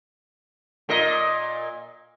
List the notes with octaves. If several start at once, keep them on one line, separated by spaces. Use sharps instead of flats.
A#2 A#4 D#5